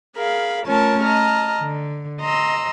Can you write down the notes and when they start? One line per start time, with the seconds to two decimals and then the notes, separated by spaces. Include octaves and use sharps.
0.17 G#4 A#4 F5 B5
0.64 A3 C#4 F4 A#4 C#5 A5
1.03 D#5 A5 A#5 F6
1.59 D3
2.20 D#5 A#5 C6 E6